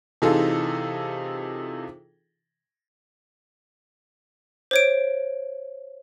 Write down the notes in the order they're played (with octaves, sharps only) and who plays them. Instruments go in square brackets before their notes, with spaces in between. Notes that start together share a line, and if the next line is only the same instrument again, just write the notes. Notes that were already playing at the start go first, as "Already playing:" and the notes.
[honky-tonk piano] C3 E3 D#4 F4 G#4 A4
[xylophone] C5 C#5 D7